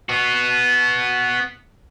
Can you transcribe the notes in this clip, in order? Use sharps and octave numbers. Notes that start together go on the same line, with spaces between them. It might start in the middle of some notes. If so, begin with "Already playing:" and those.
B3 F#4